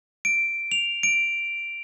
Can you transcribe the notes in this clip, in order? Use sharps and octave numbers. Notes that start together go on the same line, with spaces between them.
D7
F7
D7